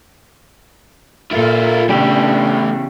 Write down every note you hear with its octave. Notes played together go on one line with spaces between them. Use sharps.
A#2 E4 F4 A4 A#4
E2 A2 C#3 D4 G4 B4